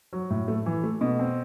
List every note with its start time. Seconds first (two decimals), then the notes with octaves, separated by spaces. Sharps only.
0.13 F#3
0.30 A2
0.48 A3
0.66 E3
0.83 A3
1.01 B2
1.19 C4